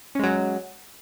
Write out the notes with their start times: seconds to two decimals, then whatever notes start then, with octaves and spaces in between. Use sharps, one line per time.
0.15 C#4
0.19 G#3
0.23 F#3